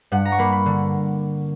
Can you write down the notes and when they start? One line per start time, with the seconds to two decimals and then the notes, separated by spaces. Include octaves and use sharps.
0.12 G2 F#5
0.25 A#5
0.32 C#6
0.39 A#3 B5
0.52 B5
0.66 D3